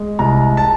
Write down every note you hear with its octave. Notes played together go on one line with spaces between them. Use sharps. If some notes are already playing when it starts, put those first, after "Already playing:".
Already playing: G#3
C2 A#5
A5